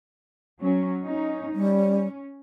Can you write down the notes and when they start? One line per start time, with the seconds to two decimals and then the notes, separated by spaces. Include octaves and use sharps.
0.61 F#3 C#4
1.03 C#4 D#4
1.55 G3 C#4